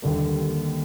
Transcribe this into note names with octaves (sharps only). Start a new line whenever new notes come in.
D#2 D3 G3 A#3